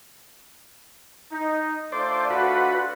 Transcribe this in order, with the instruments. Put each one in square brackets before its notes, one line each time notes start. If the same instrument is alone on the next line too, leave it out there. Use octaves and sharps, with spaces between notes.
[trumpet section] D#4
[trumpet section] A3 D4 F4 [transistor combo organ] C5 D5
[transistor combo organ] F#4 B4